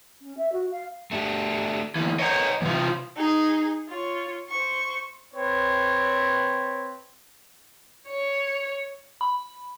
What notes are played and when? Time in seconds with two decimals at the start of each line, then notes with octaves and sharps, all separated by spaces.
0.22 C#4
0.37 E5
0.53 F#4
0.71 F5
1.11 A3 D4 G4
1.95 D2 E3
2.19 C5 C#5 D#5 F#5 A#5
2.62 C3 E3 G3 F4
3.16 D#4 G#4
3.89 F4 C#5
4.49 C5 C#6
5.34 C4 B4 C#5
8.08 C#5
9.21 B5